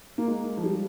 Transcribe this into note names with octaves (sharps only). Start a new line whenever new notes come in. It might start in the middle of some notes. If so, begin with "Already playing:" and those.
A#3
G#3
F3
G3